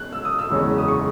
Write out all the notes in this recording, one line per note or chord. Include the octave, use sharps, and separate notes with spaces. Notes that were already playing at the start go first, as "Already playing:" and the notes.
Already playing: C#3 G#3 B3 F#6 G#6
E6
D#6
E6
F#1 E2 C#3 G#3 C#4
D#6
C#6